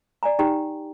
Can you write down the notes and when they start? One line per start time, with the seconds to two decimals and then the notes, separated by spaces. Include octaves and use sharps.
0.23 D5 G#5 A#5
0.39 D#4 G4 G5 A#5